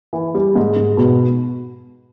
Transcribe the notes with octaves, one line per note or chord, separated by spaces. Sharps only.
E3
G3
G#2
G#2
B2